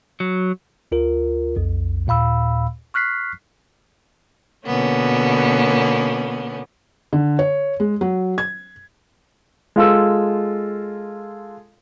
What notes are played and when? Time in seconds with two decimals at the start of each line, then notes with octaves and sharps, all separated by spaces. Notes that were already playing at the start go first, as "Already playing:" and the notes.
0.20 F#3
0.92 D2 F4 A#4
1.56 B1 F2
2.07 D#2 A#2 F5 B5 E6
2.94 C#6 F6 F#6 B6 C7
4.66 B2 D3 A#3 B3 C#4
7.13 D3
7.39 C#5
7.80 G#3
8.01 F#3
8.38 G#6
9.76 G#3 F4 A4 E6